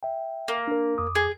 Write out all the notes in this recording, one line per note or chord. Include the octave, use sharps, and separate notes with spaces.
E5 G5
A#3
D4 A#4
F2 D6 D#6
G#4